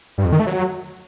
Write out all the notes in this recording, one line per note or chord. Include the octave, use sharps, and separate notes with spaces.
G2
F2
D#3
A3
F#3